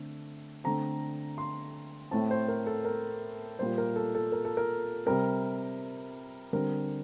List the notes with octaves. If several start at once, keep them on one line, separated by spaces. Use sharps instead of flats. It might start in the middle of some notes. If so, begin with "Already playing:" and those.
Already playing: D3 A3 C4
D3 A3 C4 A#5
C6
A2 A3 C4 A5
C5
A#4
A4
A#4
A#2 G3 A#3 C5
A#4
A4
A4
A#4
A4
A#4
C3 G3 C4 A#4
D3 G3 C4 A#4